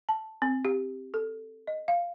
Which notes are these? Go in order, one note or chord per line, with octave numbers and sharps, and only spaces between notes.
A5
C4
G4
A4
D#5
F5